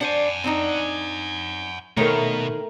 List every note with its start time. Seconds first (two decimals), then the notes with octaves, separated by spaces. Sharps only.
0.01 D4 C5 F#5 G#5
0.44 C4 D4 D#4
1.97 B2 D#3 A3 A#4 C5 C#5